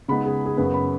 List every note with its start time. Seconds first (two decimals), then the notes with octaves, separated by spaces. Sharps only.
0.08 C#3 G#3 B3 D#4 B5
0.26 G#4
0.46 G#4
0.58 F#2 C#3 B3 B4
0.74 B5